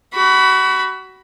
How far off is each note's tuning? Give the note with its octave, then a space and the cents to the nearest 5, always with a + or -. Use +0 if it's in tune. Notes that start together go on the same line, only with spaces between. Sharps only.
F#4 +30 B5 +0